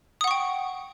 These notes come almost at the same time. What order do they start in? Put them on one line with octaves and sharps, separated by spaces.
D#6 F#5 C#6 G5